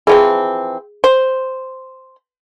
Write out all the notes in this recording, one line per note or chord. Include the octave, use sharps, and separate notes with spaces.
E3 F3 C4 G#4
C5